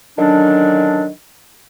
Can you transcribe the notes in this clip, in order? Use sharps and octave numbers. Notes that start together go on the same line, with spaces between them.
D3 D#3 F#3 C#4 D4